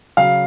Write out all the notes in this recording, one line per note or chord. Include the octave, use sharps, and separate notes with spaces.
C#3 F#3 F5